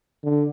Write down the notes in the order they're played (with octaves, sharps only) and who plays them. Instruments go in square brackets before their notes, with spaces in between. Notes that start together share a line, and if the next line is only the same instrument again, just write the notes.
[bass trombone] D3